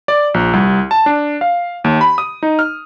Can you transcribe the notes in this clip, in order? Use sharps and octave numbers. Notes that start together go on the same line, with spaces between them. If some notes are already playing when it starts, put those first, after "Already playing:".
D5
A#1
C2
A5
D4
F5
D#2
B5
D#6
D#4
F6